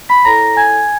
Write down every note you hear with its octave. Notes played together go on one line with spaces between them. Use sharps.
B5 B6
E4 A4 C#5 A#5 A#6
G#5 G#6